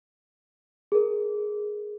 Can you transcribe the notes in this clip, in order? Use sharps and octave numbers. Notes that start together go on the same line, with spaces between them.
G#4 A#4